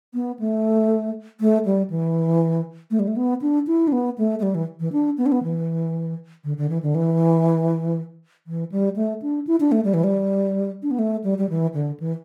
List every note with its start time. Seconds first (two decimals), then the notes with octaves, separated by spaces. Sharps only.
0.14 B3
0.39 A3
1.41 A3
1.65 G3
1.90 E3
2.91 A3
2.99 G3
3.08 A3
3.16 B3
3.42 D4
3.67 E4
3.88 D4
3.92 B3
4.18 A3
4.39 A3
4.43 G3
4.55 E3
4.80 E3
4.93 D4
5.18 B3
5.26 D4
5.32 B3
5.43 E3
6.44 D3
6.58 D3
6.70 E3
6.83 D3
6.95 E3
8.47 E3
8.72 G3
8.96 A3
9.22 D4
9.47 E4
9.60 D4
9.72 A3
9.85 G3
9.94 E3
10.04 G3
10.83 D4
10.91 B3
10.99 A3
11.24 G3
11.38 G3
11.49 E3
11.74 D3
12.00 E3